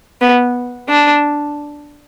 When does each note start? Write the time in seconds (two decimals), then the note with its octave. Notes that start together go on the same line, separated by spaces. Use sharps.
0.21 B3
0.89 D4